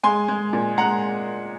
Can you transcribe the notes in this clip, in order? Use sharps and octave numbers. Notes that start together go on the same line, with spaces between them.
G#3 G#5 C6
G#3
A#2
G#3 F#5 A#5